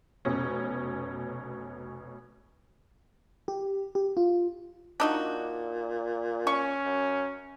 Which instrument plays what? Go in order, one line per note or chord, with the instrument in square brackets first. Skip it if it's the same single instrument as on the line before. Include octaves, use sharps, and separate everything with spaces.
[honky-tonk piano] F1 B2 C#4
[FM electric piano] G4
G4
F4
[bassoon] A#2 [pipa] D4 D#4 F#4
[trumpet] C#4 [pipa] C#6
[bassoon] F#2